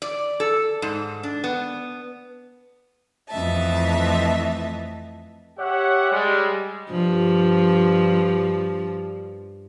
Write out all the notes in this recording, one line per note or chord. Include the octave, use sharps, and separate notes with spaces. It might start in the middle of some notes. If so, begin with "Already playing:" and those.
D5
A4
G#2
D4
B3
F2 E3 A3 D#5 E5 A5
G4 C#5 E5 F#5
G3 G#3
G2 F3